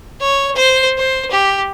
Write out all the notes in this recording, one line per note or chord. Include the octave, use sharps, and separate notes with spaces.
C#5
C5
C5
G4